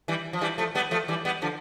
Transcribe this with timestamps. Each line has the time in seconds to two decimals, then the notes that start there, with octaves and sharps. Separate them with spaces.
0.08 E3 G3
0.33 F3
0.41 E3 G3
0.58 F3 A3
0.75 G3 B3
0.91 F3 A3
1.08 E3 G3
1.25 G3 B3
1.42 D3 F3